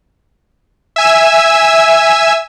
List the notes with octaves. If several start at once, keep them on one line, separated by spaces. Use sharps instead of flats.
E5 G#5 E6